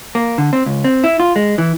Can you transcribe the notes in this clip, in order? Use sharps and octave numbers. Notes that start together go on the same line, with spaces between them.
A#3
D3
C4
C#2
C4
E4
F4
G#3
E3